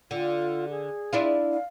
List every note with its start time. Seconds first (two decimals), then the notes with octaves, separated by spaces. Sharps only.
0.11 D3 F4
0.70 G#4
1.13 D4 E4 F4
1.52 F5